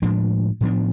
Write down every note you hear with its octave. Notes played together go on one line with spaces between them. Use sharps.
A2 F3 G#3 D4
A2 F3 B3 D4